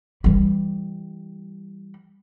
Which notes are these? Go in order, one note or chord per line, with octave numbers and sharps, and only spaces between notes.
E3 G3